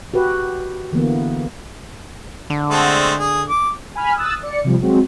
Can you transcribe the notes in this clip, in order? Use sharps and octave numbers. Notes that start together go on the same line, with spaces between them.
F#4 G4 B4
D3 E3 A#3 B3
D3
G#3 A3 C4
G#4
D6
G#5 B5 F6
D#6 E6 F#6 A6
D5 C#7
C3 F3 G3
F#3 G#3 C4 F#4